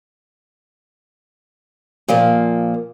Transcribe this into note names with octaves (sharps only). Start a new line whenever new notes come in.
A#2 F3 A#3